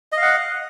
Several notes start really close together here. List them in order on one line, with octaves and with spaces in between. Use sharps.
D#5 F5 F#5